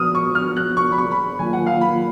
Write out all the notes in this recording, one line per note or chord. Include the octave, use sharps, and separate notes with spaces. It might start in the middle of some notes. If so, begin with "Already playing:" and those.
Already playing: F3 B3 F#4 D#6 F6
C#6
F6
F#6
C#6
B5
C#6
B5
D#3 F#3 A#3 F4 G#5
F#5
F5
B5